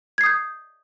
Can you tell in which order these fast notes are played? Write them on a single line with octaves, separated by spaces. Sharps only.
G#6 C7 D#6 G6